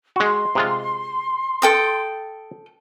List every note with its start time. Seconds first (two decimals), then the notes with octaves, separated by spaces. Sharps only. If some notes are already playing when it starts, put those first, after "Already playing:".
0.16 G#3 F#4 C6
0.55 C3 G#3 F4
1.62 A4 G5 D#6